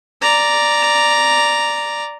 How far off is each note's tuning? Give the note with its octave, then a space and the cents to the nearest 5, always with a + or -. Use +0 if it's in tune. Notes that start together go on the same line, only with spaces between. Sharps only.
D5 +0 A#5 +0